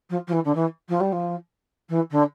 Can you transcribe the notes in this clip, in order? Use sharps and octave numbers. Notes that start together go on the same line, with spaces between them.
F3
F3
E3
D3
E3
F3
G3
F3
E3
D3